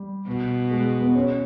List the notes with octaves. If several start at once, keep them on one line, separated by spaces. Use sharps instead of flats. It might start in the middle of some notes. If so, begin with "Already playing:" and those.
Already playing: G3
B2
G#3
B3
C#4